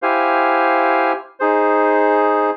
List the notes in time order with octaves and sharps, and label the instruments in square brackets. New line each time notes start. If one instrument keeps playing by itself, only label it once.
[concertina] E4 G4 C5 F5 G#5
D#4 G#4 C5